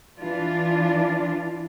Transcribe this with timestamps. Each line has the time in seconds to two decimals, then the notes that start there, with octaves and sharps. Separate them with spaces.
0.20 E3 D4 F4